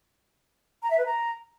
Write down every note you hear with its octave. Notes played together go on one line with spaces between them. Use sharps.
A#5
E5
B4
A#5